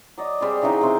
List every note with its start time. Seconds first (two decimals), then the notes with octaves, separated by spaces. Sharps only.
0.18 F#3 D5 D#5
0.41 G3 C4 G#4
0.62 C#3 E3 F#3 D#4
0.81 C3 C4